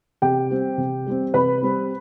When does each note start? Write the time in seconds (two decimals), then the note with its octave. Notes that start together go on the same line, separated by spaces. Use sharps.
0.22 C3 G4 G5
0.50 G3 C4
0.78 C3
1.07 G3 C4
1.34 C3 B4 B5
1.62 G3 C4